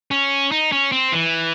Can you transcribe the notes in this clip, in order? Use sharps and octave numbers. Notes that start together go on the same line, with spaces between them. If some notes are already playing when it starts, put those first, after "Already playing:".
C#4
D#4
C#4
C4
E3